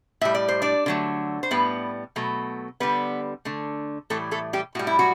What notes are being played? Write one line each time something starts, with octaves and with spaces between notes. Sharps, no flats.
A2 G3 E5
D5
C5
D4 D5
D3 F#3 A3
C5
A2 G3 B3 B4
B2 F#3 A3
D3 G3 B3 B4
D3 A3
A2 E3 G3 A3 A4
A3 A4
G3 G4
A2 G3 F#4
E4
F#3 F#4